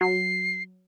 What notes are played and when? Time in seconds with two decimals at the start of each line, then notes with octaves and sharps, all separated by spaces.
0.01 F#3 C7